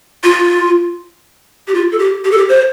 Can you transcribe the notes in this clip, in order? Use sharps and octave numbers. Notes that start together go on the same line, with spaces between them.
F4
G4
F4
A4
G4
G4
A4
G4
C5